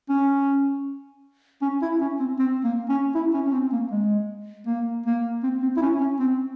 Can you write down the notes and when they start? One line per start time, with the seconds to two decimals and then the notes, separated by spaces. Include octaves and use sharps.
0.10 C#4
1.62 C#4
1.82 E4
2.01 C#4
2.20 C4
2.39 C4
2.64 A#3
2.89 C#4
3.15 E4
3.34 C#4
3.47 C#4
3.53 C4
3.73 A#3
3.91 G#3
4.67 A#3
5.06 A#3
5.43 C4
5.62 C4
5.77 E4
5.82 C#4
6.00 C#4
6.20 C4